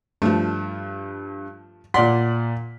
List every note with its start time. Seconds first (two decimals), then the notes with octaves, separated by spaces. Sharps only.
0.22 G2 F3 A3
1.94 A#2 D5 F#5 C6 B6